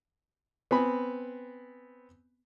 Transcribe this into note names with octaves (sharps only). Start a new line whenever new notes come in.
B3 C4 G#5 B5